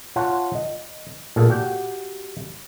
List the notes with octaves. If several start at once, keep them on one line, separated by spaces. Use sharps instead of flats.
F4 C#5 F#5 A5
D#5
A#2 G#4 A4
F#4 G4 G5